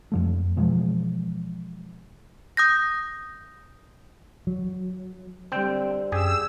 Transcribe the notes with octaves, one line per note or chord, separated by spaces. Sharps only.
F2 F3 A3
B2 E3 F3 G#3
D#6 G6 A#6
F#3
D3 G3 C4 G5
F#2 G4 G#4 E6